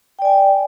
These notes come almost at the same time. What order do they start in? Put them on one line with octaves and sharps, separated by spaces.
G5 D5 G#5